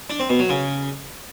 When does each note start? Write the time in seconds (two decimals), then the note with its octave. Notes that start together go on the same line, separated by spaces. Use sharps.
0.10 D4
0.20 C4
0.29 B2
0.39 F#3
0.49 C#3